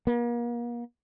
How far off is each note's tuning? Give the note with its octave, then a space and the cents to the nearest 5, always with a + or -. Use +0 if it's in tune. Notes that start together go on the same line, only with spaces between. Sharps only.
A#3 +40